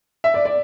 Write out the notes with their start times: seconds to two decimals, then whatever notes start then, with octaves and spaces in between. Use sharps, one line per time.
0.24 E5
0.34 D5
0.45 D5